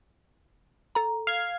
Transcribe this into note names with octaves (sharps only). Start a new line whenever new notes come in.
A4 A#5
F5 G#6